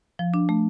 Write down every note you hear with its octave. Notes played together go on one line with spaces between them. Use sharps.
F3
D4
A3